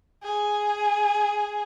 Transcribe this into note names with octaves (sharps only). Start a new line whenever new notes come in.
G#4